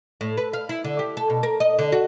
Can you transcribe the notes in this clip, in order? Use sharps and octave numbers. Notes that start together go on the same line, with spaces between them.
A2
B4
F5
E4
D3
G4
A4
B2
A#4
D#5
D3
F#4